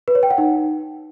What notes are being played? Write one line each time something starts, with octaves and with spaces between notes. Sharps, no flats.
B4
C#5
G5
F#5
D#4